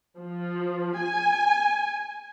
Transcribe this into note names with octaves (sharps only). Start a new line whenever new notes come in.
F3
G#5